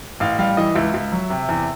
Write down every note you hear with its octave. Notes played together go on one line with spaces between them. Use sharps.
A1 F5
G3 F5
E3 D#5
C#2 E5
C#2
F#3
C3
E2